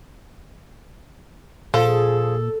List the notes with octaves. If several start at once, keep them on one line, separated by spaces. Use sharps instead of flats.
A#2 F3 G#4 A4